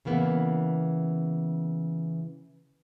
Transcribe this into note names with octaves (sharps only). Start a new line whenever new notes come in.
C#3 E3 A#3 B3